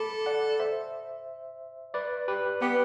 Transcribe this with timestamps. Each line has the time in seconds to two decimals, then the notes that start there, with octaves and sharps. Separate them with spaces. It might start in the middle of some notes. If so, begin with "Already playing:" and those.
Already playing: A4 B5 D6
0.26 D5 F#5
0.60 C5 E5
1.94 B4 D5
2.28 G4 B4
2.61 B3 G4 B4